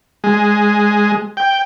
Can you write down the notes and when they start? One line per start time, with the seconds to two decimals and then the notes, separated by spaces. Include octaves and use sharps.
0.24 G#3
1.37 G5